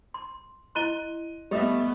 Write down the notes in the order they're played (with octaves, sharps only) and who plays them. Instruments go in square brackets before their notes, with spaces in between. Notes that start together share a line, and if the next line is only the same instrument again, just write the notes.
[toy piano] C6
[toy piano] E4 D#5 C6 [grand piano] F#6 D#7 G7
[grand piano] G3 E5 [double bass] A3 B3 [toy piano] G4 D#5 D#6